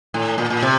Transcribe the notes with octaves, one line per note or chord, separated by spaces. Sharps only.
A2
A#2
A#2
C3